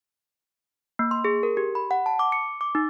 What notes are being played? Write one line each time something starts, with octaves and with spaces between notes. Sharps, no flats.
A#3
C6
G#4
A#4
G4
B5
F#5
A5
D6
C#7
D6
D#4